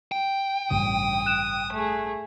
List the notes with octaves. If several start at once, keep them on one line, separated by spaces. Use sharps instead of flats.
G5
A1 G2 C#3 D#6
F#6 E7
A3 G#4